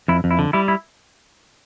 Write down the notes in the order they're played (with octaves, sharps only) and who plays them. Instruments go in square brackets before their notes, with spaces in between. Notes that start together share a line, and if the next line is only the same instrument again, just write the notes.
[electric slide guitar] F2 [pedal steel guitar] E4
[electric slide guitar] F2
[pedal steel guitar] E4
[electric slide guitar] D3
[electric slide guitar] G3 [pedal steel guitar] E4
[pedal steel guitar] E4